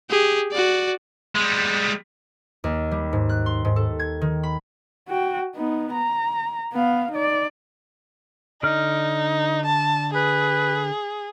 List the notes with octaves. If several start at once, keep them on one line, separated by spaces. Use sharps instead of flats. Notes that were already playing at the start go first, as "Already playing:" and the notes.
G4 G#4
F#4 D5
G3 G#3
D#2
G3
G#2
F#6
C6
G#2
A4
G#6
D#3
B5
F#4 G5
B3 D#4
A#5
B3 F5
D#4 D5
D3 D#4 D5 F6
A5
G#4 B4